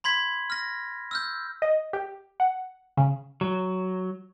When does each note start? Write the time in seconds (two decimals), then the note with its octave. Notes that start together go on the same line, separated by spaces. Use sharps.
0.04 B5 C6 G#6 B6
0.50 F6 A#6
1.11 E6 F6 G6
1.62 D#5
1.93 G4
2.40 F#5
2.97 C#3
3.41 F#3